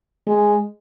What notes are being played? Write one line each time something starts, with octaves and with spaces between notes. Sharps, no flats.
G#3